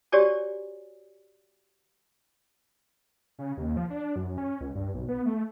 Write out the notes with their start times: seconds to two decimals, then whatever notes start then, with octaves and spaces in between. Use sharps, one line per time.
0.12 F#4 G4 C#5 D5 G#5
3.39 C#3
3.57 D#2
3.77 F3
3.90 D4
4.16 F#2
4.38 C#4
4.61 C#2
4.75 G2
4.94 B1
5.09 B3
5.26 A3